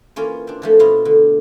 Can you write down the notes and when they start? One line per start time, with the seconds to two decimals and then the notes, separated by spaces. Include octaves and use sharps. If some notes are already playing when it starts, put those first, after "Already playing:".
0.16 E3 A#3 C#4 F4
0.47 C4 D4
0.62 E3 F3 A3
0.79 B2 E4 F4 F5
1.05 D3